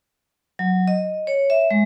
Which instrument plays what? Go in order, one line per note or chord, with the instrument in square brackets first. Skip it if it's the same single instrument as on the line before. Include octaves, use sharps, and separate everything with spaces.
[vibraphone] F#3
D#5
C#5
E5
G#3